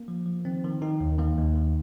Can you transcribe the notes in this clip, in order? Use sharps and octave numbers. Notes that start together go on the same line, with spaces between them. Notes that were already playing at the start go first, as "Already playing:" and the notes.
Already playing: A#3
F3
F3
D#3 C4
D#3
D#3 D#4
D#2
D#3 A#3
D#2
D#3